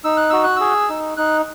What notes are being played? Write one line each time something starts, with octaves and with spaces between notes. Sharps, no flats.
D#4 E6
F#6
F#4 E6
F#6
G#4 E6
D#4
D#4 F#6